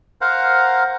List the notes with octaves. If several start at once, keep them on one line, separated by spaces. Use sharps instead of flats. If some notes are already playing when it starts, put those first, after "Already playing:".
A#4 C5 F5 F#5 A#5